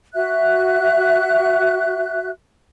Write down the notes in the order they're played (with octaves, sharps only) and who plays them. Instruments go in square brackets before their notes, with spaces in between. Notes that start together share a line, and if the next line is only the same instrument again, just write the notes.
[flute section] F#4 E5 F#6